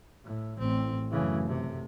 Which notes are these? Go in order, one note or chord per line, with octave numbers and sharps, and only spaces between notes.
A2
A1 C4
F#2 C#3 E3 A3
C3